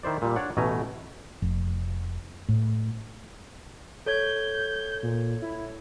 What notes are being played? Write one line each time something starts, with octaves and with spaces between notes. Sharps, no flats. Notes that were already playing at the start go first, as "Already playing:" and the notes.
D#3 E4 C5 D5
A#2 G3
D4 C#5 D5 F#5
A1 B2 A3 G#5 A#5
F1
A2
A4 C#5 G6 G#6
A#2
E4